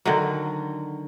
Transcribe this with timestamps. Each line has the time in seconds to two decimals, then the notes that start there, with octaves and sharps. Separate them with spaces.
0.05 D3 D#3 F#3